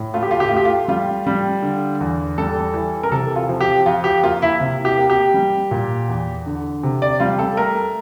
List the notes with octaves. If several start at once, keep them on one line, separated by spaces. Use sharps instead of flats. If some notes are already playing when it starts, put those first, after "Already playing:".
Already playing: A2
A3 F4
G4
F4
G4
A3 F4
G4
F4
G3 F4
G3
D3
E2
G3 A4
E3
A#4
C3 A4
F4
F3
G4
F2 F4
G4
A#3 F4
E4
C3
G4
A#3
G4
G3
A#2
E2
D3
C3
D5
G3 F4
A4
A3 A#4